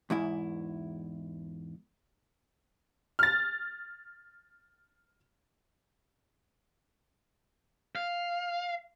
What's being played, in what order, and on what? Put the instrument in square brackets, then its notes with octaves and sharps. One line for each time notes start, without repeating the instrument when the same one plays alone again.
[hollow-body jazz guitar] E2 G#2 E4
[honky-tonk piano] F6 A6
[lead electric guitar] F5